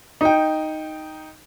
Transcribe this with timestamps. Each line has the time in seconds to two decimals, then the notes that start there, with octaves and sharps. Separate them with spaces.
0.21 D#4 G5